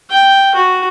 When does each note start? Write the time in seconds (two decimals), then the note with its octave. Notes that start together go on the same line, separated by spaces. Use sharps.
0.10 G5
0.55 F#4